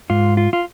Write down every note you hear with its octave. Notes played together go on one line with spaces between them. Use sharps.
G#2 F4
F4
F4